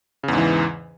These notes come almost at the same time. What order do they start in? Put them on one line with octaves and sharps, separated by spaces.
C#3 E2 G#2 E3